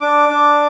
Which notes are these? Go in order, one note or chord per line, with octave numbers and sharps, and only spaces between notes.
D4 D6
D4